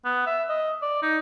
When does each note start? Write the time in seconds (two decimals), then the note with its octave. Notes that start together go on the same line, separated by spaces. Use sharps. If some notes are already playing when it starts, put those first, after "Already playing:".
0.05 B3
0.26 E5
0.49 D#5
0.82 D5
1.02 D#4